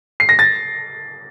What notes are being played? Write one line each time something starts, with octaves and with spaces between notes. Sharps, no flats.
C7
A#6
A6